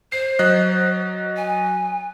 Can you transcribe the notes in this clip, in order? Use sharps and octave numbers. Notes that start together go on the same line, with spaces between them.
C5 C7
F#3 D#5 F#6
G#5